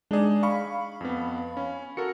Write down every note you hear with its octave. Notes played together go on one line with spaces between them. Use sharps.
G#3 D4 D#4 G#4 D5
F5 B5 C#6
F2 B3
C#4
F#4 A4 A#4 C#7